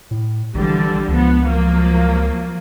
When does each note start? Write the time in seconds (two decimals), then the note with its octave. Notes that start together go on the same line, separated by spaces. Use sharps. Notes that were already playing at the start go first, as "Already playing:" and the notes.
0.11 A2
0.54 A#1 D3 E3 G3
1.08 C#2 F3 B3
1.46 F3 F#3 A#3